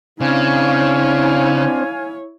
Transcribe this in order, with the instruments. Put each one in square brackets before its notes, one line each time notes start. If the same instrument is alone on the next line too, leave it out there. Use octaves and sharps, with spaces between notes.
[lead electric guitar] C#3 [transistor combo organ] C4 D4 [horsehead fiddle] E4 C#5 [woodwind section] F5 G#5